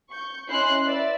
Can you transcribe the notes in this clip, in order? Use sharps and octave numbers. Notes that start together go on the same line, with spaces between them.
C#6 G6
C#4 E4 D#5 C6 F#6 C7
B4 D5 E5